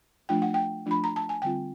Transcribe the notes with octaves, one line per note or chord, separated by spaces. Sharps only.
F3 A3 D4 F4 G5
F#5
G5
F3 A3 D4 F4 B5
A#5
A5
G#5
D3 G3 C4 F4 G5